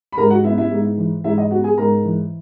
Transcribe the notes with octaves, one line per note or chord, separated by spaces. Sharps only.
B5
G#2 A#4 A#5
F#4 F#5
B3 E4 E5
E4 E5
G#2
E3
G#2 E4 E5
D#5
B3 F#4 F#5
G#4 G#5
G#2 A#4 A#5
E3